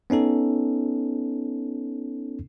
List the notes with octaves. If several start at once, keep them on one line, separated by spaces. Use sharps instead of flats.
B3 C#4 D#4 A4